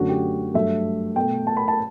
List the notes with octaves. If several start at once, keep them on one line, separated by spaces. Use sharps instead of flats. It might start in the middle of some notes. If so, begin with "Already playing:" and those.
Already playing: F#2 D3 A3 F#4
G4
G2 F#3 A3 E5
B2 A3 G5
A5
B5
A5